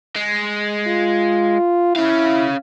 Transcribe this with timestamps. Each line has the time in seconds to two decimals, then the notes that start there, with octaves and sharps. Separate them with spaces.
0.16 G#3
0.87 F4
1.96 C#4 E4 F5